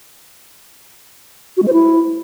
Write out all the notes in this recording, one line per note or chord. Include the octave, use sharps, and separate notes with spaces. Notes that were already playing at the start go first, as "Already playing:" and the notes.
F#4
G#3
C5
E4